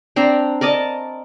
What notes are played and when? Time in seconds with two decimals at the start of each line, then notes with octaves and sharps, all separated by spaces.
0.16 C4 D4 G5 A#5
0.61 A#4 D5 D#5 A5